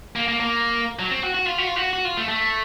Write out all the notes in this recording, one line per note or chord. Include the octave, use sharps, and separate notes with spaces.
A#3
A#3
A#3
F#3
C4
F#4
F#4
F4
F#4
F4
F#4
F#4
F4
A3
A3